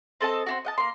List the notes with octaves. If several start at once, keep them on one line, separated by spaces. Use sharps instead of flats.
C4 A4 D#5 A5
C4 D4 F#4
D#5 F#5 A5
A#3 C6